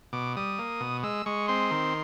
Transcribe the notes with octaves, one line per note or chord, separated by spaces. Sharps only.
B2 D6
G3 D#6
A#3
B2
G#3 E6
G#3 C#6
C4 C6
D#3